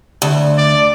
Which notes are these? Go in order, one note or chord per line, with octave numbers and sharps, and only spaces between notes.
D2
D5